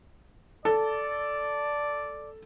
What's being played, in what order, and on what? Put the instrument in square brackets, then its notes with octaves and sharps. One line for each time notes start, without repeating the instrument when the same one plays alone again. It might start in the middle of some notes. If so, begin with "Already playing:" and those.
[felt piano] A4 [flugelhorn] D5